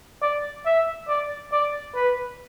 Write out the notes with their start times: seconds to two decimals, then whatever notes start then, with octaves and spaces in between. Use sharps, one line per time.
0.22 D5
0.65 E5
1.08 D5
1.52 D5
1.95 B4